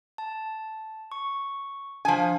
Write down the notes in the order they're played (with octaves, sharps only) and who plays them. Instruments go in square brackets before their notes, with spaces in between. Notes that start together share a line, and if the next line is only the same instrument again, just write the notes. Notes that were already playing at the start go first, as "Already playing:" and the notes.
[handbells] A5
C#6
[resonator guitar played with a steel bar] F3 G#5 [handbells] D4 F5